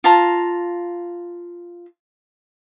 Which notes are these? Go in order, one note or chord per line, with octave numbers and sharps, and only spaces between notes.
F4 A5 A#5